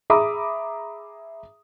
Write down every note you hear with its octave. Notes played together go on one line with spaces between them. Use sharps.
G#4 E5 A#5 B5 D6 D#6